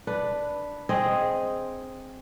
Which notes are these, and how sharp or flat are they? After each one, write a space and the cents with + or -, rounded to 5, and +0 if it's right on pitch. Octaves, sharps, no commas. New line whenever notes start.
D4 +0 B4 +0
C4 +0 G#4 +0 D#5 +0